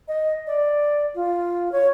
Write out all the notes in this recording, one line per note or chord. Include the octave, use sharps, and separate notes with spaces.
D#5
D5
F4
C#5